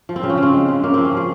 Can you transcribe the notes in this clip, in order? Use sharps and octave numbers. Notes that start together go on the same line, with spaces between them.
F3
C4
C#3
C#4
C#3 C4
G#3
C#3
C#3 A#3
F3 C4
C#4
F3 G#4